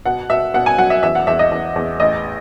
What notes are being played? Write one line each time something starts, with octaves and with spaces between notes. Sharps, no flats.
B2 F#5
B2 E5
B2 F#5
G#5
F#3 F#5
E5
E2 E5
F#5
E2 E5
D#5
E2
E2
A1 D#5